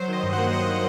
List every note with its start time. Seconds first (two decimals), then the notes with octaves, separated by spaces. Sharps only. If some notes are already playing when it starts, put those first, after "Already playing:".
Already playing: F#3 C5
0.08 D#3 D#5
0.23 G2
0.33 A#3 F#5
0.52 A#3 D#5
0.68 A#3